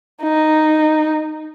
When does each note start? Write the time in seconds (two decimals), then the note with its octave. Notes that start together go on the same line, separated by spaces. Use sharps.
0.22 D#4